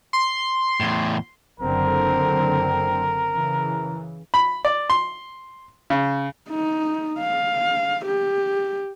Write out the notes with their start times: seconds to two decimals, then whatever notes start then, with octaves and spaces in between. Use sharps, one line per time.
0.13 C6
0.80 E2 A2
1.60 F#1 D3 C4 A#4
3.35 C#3 E3
4.34 B5
4.65 D5
4.90 C6
5.90 C#3
6.50 D#4
7.21 F5
8.06 G4